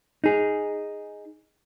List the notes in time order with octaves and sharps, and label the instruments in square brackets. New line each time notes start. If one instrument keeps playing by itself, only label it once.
[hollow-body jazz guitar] D#4 G#4